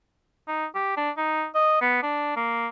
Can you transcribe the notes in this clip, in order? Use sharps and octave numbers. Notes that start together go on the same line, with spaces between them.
D#4
G4
D4
D#4
D#5
B3
D4
A#3